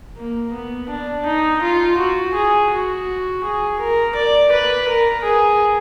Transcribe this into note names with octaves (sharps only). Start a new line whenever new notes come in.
A#3
B3
D4
D#4
F4
F#4
G#4
F#4
G#4
A#4
D5
B4
A#4
G#4